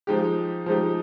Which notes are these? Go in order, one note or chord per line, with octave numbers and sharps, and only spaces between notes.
F3 G#3 D#4 G4
F3 G#3 D#4 G4